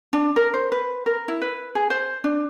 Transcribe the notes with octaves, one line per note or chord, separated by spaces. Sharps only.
D4
A#4
C5
B4
A#4
E4
B4
G#4
C5
D4